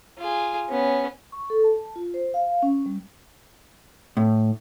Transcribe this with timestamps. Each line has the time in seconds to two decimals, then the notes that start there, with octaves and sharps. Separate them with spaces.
0.18 F4 G#4
0.69 B3 C#4
1.32 C#6
1.50 A4
1.64 A5
1.96 F4
2.14 C5
2.34 F5
2.62 C#4
2.86 G3
4.17 A2